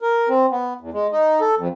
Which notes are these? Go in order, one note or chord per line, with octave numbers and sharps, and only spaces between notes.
A#4
C4
B3
E2
G#3
D#4
A4
F2